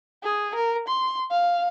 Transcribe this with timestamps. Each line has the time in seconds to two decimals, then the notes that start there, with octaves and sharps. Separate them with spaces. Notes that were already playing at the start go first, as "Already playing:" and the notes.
0.23 G#4
0.55 A#4
0.88 C6
1.31 F5